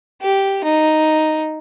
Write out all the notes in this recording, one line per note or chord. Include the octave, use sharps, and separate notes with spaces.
G4
D#4